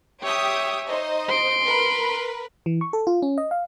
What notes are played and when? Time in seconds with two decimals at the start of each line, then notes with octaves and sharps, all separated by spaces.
0.23 G4 C#5 E5 G5 D#6
0.87 D#4 C5 D#5
1.28 C6 D7
1.65 A#4 B4
2.66 E3
2.81 C#6
2.93 A4
3.07 F4
3.22 C#4
3.38 D#5
3.51 F5